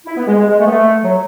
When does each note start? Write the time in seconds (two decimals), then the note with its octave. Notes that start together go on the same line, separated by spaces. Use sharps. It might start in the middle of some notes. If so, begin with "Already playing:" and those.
0.06 E4
0.17 B3
0.27 G#3
0.39 G#3
0.50 G#3
0.60 A3
0.66 B3
0.71 A3
1.04 F#3